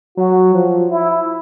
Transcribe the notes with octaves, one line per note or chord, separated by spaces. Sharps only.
F#3 F#4
F3
E4